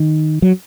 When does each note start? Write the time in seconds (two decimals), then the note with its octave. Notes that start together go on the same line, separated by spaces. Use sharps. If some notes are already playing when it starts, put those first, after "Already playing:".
Already playing: D#3
0.42 F#3